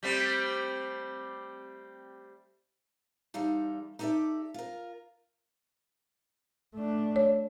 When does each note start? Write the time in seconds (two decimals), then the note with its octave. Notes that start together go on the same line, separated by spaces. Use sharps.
0.03 G3 A3 C4
3.34 E2 G3 D#4 A4 F5
3.99 D#4 G4 A4 B4 D5 E5
4.54 F4 A#4
6.75 A3 D4
7.16 C#5